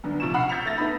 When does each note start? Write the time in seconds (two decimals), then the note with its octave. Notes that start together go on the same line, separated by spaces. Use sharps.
0.04 F#2 D3 B3
0.20 C3 F3 F4 C#6 E7
0.34 F#5 A#5 B5 F6 C7
0.49 E6 G6 A6 B6 C#7 F7
0.66 A3 E4 A6 A#6
0.78 A3 B3 D#4 B5